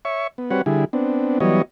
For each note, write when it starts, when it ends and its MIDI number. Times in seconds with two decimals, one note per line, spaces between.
0.05 0.27 73
0.05 0.27 76
0.05 0.27 85
0.38 0.50 59
0.51 0.62 55
0.51 0.62 60
0.51 0.62 66
0.51 0.62 71
0.51 0.62 73
0.51 0.62 78
0.66 0.85 50
0.66 0.85 55
0.66 0.85 64
0.66 0.85 68
0.93 1.39 59
0.93 1.39 60
0.93 1.39 62
1.40 1.62 52
1.40 1.62 54
1.40 1.62 55
1.40 1.62 59
1.40 1.62 73
1.40 1.62 75